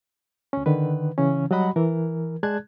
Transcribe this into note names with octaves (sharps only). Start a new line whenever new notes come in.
D2 C#4
D3 D#3 B4
C#3 E3 C#4
F#3 G3 F#4 D#5 F#5 B5
E3 A#4
G#3 G#4 D5 A5 F#6 G#6